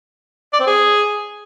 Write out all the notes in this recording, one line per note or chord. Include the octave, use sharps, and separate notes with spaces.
D5
C4
G#4